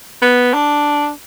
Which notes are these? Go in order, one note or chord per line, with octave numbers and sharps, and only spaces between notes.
B3
D4